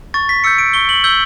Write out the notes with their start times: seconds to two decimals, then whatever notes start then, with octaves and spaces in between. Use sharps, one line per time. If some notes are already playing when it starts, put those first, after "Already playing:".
0.14 C#6 A6
0.29 B6
0.44 E6 G6 C#7
0.58 D7
0.74 C#6 G7
0.89 F#7
1.04 E6 G6 G7